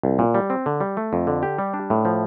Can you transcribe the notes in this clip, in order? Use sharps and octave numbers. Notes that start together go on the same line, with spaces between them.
C2
A#2
G3
C4
D3
G3
A3
F2
D3
G4
G3
D4
A2
F3